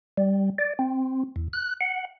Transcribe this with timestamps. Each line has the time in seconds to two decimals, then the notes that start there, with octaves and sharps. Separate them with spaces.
0.18 G3
0.58 D5
0.79 C4
1.36 E2
1.53 F#6
1.81 F#5